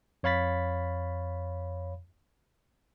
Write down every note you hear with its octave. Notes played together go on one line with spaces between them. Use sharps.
F2 C#5 F5 B5 A6 B6